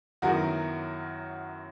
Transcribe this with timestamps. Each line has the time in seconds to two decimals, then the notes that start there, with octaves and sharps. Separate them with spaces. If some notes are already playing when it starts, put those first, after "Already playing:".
0.22 F#2 D#3 F#3 B3 E4 F#4 A#4